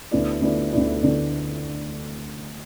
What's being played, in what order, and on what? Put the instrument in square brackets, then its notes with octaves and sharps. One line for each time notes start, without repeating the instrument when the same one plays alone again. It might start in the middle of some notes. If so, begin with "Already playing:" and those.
[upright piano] D2 D3 B3 E4 D5
D2 D3 B3 E4 D5
D2 D3 B3 E4 D5
D2 D3 B3 E4 D5